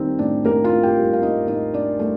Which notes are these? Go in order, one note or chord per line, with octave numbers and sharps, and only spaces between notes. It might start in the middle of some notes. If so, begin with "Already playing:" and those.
Already playing: D#3 G3 A#3 C4 D#4
A2 D4
A2 A#3 A#4
F4 F5
A#3
G4 G5
G3
F5
A2 D#4 D#5
A2 D#4 D#5
A#3 D4 D5
G3 A3 A4